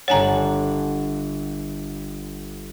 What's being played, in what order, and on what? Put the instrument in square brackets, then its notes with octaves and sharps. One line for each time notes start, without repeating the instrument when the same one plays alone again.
[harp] G1 D4 F#5 [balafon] C#5 G#5 A#5